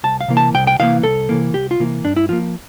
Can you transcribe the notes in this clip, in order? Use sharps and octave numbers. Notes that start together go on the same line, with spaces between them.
C2 A5
F5
C3 E3 A#3
A5
C2 G5
G5
C3 E3 A#3 F5
C2 A4
C3 E3 A#3
C2 G4
F4
C3 E3 A#3
G2 D4
E4
F3 A#3 F4